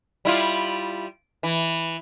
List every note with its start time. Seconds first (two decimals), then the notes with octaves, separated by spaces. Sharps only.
0.25 G3 E4 F4
1.43 E3